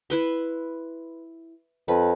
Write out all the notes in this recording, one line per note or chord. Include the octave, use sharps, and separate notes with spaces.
E4 B4 C6
F2 B4